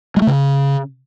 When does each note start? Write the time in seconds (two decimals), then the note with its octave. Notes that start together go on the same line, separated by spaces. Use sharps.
0.17 G#3
0.22 A3
0.27 C#3